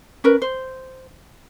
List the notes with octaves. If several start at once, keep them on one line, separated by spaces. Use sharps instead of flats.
C#4 A#4 B4
C5